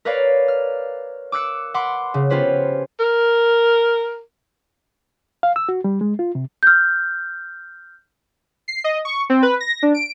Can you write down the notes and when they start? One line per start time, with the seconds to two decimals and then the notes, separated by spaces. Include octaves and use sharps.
0.05 A#4 B4 C#5 D5 F5
0.48 F6
1.32 D6 E6 F#6 C#7
1.74 F#5 B5 C6 D6
2.14 C#3
2.30 B3 C#4 F4 G4 B4 C5
3.00 A#4
5.43 F5
5.56 E6
5.69 F#4
5.84 G3
6.01 G#3
6.19 F4
6.35 C3
6.63 F6 G6
8.68 C7
8.84 D#5
9.05 C#6
9.30 C4
9.43 B4
9.60 A#6
9.83 D4
9.94 D7